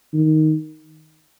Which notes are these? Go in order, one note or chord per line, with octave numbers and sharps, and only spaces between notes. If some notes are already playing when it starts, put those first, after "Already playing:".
D#3